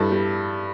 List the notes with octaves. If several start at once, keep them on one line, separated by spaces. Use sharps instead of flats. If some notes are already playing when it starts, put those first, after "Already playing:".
Already playing: G2 G3 E4 A4
G3